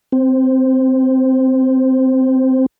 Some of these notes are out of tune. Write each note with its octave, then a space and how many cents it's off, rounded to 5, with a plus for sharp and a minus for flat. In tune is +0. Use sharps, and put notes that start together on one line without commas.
C4 -5 C5 +0